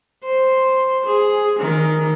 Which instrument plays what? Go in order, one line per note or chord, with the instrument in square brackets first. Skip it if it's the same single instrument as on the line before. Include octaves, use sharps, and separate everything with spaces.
[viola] C5
G#4
D#3